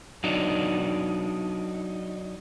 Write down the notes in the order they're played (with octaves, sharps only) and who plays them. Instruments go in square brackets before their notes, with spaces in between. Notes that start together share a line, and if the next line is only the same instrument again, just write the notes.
[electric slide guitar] F#3 D4 D#4